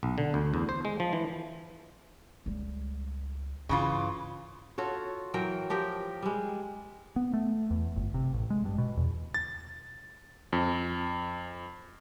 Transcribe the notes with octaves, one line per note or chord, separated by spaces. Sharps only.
B1
D3
D2
E2
C5
G#3
F3
E3
C#2 G3
G2 C#3 E3 F4
F4 F#4 A4 C#5
E3 F#3 A#4 G5
F3 G4 A#4 G5
G3 G#3
B3
A3
E2
G1
C3
A1
G#3
G2
B2
E2
A6
F2